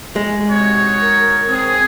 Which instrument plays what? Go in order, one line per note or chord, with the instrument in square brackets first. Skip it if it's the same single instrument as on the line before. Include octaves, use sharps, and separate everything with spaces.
[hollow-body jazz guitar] G#3
[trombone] C3 [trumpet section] D#4 F#4 C#5
[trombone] A#4
[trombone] C4 [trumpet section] G#4